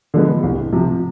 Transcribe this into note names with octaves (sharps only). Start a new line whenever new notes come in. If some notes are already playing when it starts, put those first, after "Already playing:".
D3 F3 G#3 B3
C2
C3 F3